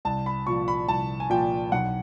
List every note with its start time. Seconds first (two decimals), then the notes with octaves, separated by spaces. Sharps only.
0.05 C2 A5
0.26 B5
0.46 A#2 F3 C#6
0.68 B5
0.88 C2 A5
1.20 G#5
1.30 A#2 F3 G5
1.72 B1 F#5